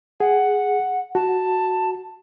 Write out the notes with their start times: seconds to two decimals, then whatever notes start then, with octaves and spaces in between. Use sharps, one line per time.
0.20 G#4 F#5
1.15 F#4 A5